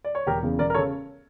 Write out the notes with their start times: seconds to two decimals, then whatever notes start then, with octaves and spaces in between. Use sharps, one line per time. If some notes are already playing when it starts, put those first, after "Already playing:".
0.05 D5
0.15 C#5
0.26 E1 G4 A#4
0.43 E2 C#3
0.58 E1 A#4 D5
0.70 A#4
0.74 A4 C#5
0.78 C#3